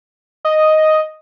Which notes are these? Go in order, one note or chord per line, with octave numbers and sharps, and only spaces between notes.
D#5